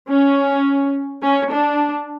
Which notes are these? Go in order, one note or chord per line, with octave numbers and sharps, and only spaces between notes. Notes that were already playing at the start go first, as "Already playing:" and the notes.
C#4
C#4
D4